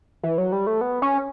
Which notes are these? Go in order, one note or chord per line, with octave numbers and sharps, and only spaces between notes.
E3
F#3
G3
A3
B3
C#4